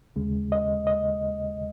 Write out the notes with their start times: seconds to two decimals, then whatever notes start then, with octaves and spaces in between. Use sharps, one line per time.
0.16 D#2 C#3 G#3
0.52 D#5
0.87 D#5